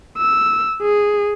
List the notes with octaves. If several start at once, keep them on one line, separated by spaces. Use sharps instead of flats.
E6
G#4